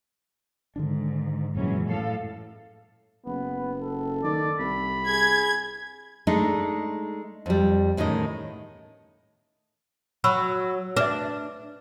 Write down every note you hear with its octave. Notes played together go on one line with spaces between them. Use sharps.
G#2 D3 D#3 D4
F#2 A#2 E3 F#3 G#3 C#4
A2 A4 F5
F#1 B3
A4
D#3 D5
C2 B5
G#4 G#6
G#3 A3 D4 D#4
F2 G3
E2 A2 D#3 C#4 D#5
F#3 B5 C#6 E6
D4 B4 E5